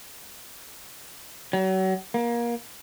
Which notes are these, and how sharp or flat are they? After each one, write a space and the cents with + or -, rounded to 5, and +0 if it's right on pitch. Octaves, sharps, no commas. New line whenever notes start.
F#3 +35
A#3 +25